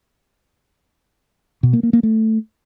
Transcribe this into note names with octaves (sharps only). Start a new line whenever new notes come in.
B2
A#3
A#3
A#3
A3